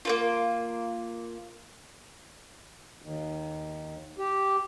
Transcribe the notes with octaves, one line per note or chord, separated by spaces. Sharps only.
A#3 C4 F4
D#2
G4